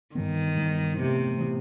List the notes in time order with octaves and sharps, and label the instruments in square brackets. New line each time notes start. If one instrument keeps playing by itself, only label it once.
[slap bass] G2 E3 B3 [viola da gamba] D#3
[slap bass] G2 E3 B3
[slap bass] A2 E3 B3 [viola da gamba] C3
[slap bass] A2 E3 B3